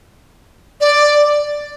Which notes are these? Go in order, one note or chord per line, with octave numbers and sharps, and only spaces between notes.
D5